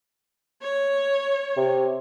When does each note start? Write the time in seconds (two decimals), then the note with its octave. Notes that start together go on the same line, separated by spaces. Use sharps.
0.62 C#5
1.57 C3